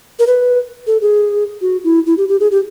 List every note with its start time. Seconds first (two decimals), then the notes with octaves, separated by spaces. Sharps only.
0.19 A#4
0.27 B4
0.87 A4
1.02 G#4
1.61 F#4
1.84 E4
2.06 E4
2.18 G4
2.29 G4
2.40 G#4
2.51 G4